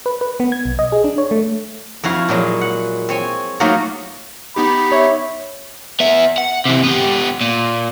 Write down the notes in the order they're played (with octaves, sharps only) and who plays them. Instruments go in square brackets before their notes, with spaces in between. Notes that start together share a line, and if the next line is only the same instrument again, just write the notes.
[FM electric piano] B4
B4
B3
G#6
B1
D#5
G#4
D4
C#5
A3
[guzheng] F2 E4 F#4 F5
A#2 F#3 G#3
F#5
C4 C#5 G#5
F#3 A3 A#3 D#4 F4 F#4
[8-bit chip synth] B3 D#4 G4 [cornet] B5
[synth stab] C#5 [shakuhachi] E5
[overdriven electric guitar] B3 E5
F#5
C3 E3
B3 G4
A#2